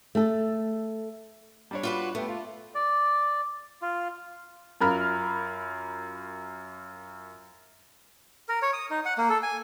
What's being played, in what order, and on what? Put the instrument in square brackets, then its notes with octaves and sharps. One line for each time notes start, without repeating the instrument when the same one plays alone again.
[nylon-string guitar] A3 A4
[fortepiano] G3 D4 C#5
[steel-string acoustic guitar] F4 F#4 B4
[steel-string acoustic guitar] A3 [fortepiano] B3 G4
[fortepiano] F4
[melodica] D5
F4
[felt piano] F#2 F4 A#4 B5 F6
[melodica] A#4
C#5
D#6
D#4
F#5
A#3
A4
G#5